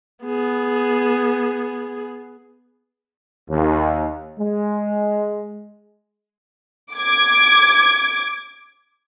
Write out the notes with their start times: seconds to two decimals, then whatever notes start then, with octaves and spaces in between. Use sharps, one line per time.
0.25 B3 G#4
3.48 D#2
4.37 G#3
6.93 D6 G#6